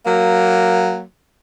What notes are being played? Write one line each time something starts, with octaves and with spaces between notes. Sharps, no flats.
F#3 A#3